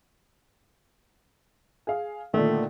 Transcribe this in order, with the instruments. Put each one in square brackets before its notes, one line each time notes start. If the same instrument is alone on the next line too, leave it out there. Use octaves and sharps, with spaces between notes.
[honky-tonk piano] G#4 F5
[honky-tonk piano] A#2 D3 D#3 [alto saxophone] A3